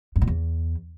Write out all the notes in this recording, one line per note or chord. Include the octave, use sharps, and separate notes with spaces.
F#2
A#2
E2